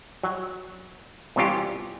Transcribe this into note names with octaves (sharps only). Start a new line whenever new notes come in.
F#3
C2 B2 E3 C#4 F4 G4